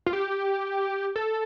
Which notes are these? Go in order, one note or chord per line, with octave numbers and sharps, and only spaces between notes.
F4
G4
A4